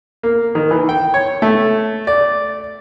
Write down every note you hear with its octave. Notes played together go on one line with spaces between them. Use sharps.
A#3
D#3
E3
G5
C#5
A3
D5